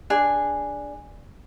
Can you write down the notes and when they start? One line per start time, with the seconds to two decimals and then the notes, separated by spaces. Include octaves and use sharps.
0.10 D4 G#4